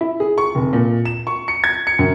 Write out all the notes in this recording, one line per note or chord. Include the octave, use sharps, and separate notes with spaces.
E4
G#4
C#6
F1
A#2
E7
C#6
C#7
G#6
C#7
F#2